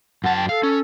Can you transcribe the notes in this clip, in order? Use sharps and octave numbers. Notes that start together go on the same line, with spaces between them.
F#2 F#5 A5
G5
A4 F5
C#4